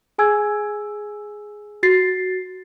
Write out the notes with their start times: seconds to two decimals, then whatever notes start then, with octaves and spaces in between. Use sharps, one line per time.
0.18 G#4 G#5 E6 G#6
1.83 F#4 A6 C7